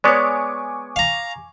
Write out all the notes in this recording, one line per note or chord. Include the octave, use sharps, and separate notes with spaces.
G#3 B3 C#5 D5 G#5 C#6 D6
F5 A#5